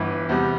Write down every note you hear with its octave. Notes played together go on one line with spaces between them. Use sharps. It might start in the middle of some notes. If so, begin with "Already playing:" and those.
Already playing: G1 G2 E3
E2 C3 G3